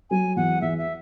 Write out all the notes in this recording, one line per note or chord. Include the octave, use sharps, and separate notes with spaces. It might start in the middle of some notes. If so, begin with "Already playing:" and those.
F#3 G#5
E2 F#5
E2 E5
E5